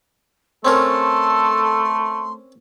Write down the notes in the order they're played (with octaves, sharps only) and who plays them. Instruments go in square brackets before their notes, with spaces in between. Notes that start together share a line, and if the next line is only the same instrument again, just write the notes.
[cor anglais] A3 [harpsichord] C4 C#4 A#4 [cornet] A4 [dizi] C6